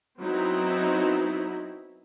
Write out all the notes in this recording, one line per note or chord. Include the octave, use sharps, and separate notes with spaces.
F#3 B3 C4 D#4 E4